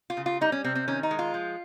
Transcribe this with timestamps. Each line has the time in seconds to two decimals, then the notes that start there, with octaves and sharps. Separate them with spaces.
0.10 F4
0.17 C#3
0.26 F4
0.41 G3 D#4
0.52 C#4
0.64 C3 C4
0.75 C4
0.88 D#3 C#4
1.03 D#4
1.11 G#3
1.19 F4
1.34 F3